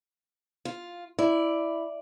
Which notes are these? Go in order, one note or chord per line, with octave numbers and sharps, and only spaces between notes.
F4
E4 D5